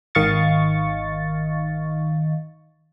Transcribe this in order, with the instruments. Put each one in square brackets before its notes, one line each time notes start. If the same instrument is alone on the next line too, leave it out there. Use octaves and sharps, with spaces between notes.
[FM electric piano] G#1 D#3 D#5 F5 C#6 A6